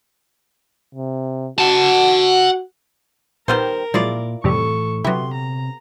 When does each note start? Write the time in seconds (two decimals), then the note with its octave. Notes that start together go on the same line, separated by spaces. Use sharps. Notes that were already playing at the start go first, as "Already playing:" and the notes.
0.95 C3
1.59 F#4 F#5 A5
3.48 A#1 D#3 G3 B3 A#4 C5 G6
3.94 A#2 F3 F#3 G#3 E4 F4 D5
4.44 F2 A2 C3 E3 G3 A4 C#6
5.04 C3 F#3 B3 C#4 E4 G4 C6
5.34 A#5